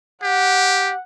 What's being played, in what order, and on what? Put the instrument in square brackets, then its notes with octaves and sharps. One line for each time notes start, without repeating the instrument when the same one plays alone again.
[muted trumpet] G4 [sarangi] F#5